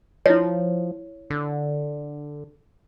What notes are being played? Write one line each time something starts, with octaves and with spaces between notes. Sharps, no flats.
F3 E4 C#5
D3